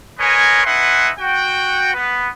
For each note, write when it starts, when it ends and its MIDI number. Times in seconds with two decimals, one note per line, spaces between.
0.19 0.60 70
0.19 0.60 71
0.19 0.60 73
0.19 0.60 75
0.19 0.60 80
0.65 1.10 63
0.65 1.10 71
0.65 1.10 76
0.65 1.10 78
0.65 1.10 80
0.65 1.10 84
1.18 1.91 66
1.18 1.91 79
1.94 2.28 59
1.94 2.28 71